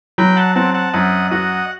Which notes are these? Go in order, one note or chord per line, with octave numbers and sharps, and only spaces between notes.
F#3 G5 B5
F#5 A5
C4 F#5 A5
F#5 A5
F#2 D#5 F#5
F#4 D#5 F#5